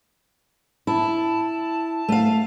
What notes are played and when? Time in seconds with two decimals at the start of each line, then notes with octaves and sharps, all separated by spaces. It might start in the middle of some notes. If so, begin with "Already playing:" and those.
0.87 E4 A5
2.08 A3 F5